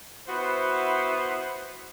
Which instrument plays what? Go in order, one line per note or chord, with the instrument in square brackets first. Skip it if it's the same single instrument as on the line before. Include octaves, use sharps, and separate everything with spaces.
[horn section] B3 E4 F#4 C5